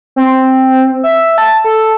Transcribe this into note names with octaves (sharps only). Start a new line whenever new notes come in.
C4
E5
A5
A4